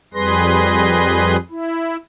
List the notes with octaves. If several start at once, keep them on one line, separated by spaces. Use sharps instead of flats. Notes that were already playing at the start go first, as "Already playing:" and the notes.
F2 G3 G#4 B4 C6 A#6
E4